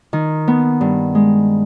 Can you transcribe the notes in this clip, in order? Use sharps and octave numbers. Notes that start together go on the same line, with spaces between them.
D#3
B3
G2
G#3